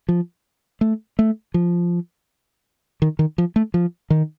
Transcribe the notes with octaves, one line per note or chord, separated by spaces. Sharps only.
F3
A3
A3
F3
D#3
D#3
F3
A3
F3
D#3